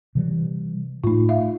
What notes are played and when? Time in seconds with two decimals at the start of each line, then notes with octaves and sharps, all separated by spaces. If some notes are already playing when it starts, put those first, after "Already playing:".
0.15 C3 E3 G3
1.04 A2 A3 D#4 F4
1.29 E5 F5